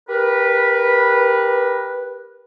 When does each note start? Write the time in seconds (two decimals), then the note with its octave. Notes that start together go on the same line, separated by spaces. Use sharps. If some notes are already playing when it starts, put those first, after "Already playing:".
0.09 G4 A#4 B4